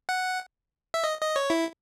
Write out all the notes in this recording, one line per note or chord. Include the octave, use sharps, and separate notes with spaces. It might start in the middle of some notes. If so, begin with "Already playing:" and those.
F#5
E5
D#5
D#5
C#5
E4